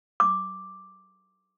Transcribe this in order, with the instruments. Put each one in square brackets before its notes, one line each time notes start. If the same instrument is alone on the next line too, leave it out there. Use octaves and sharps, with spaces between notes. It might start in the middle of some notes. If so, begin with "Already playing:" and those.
[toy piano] D6